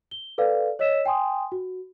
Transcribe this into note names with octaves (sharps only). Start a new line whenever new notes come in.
G7
A4 B4 D5 F5
C#5 D#5 E6 B6 E7
G5 G#5 C6 D#6
F#4